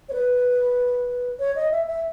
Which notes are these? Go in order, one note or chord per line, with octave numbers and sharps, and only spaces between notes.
C#5
B4
C#5
D#5
E5
E5